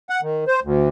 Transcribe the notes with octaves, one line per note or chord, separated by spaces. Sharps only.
F#5
D#3
C5
D2